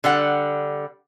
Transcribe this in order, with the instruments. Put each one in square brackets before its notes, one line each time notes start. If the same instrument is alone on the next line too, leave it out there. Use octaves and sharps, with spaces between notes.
[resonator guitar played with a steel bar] D3 G3 F#5